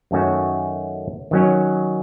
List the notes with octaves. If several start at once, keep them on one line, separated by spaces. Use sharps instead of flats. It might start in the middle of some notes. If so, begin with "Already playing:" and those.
F#2 D#3 A3 C#4 F#4
D#3 F#3 C#4